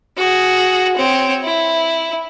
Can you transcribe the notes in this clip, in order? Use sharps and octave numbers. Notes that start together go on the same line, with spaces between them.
F#4 G#4
C4 C#5
E4